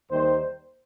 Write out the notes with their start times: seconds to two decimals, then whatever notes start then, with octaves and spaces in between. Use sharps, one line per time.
0.11 D#2 D#3 G3 C5